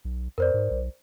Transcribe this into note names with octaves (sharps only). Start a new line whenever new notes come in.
B1
F2 A#4 C5 D5
G#2
B1